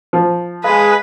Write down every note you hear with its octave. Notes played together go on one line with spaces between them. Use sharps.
F3
G#3 B4 F5